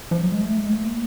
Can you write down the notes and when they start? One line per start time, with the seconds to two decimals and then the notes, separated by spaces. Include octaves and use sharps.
0.11 F3
0.21 F#3
0.32 G#3
0.41 A3
0.57 G#3
0.73 A3
0.83 A#3